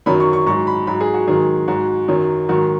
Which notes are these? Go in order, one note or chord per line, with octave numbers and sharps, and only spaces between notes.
F#2 D#3 F#3 B5
C#6
C#6
G#2 F#3 C#6
B5
G#2 F#3 B5
G#4
F#4
G#2 D#3 F#3 G#4
G#2 F#3 F#4
F#2 D#3 F#3
G#2 D#3 F#3 F#4